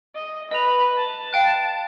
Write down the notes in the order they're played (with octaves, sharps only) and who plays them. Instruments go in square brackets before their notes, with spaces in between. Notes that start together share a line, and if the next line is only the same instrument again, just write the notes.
[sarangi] D#5
[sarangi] B4 [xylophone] D#5 F7
[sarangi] A5
[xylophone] F5 G5 F#6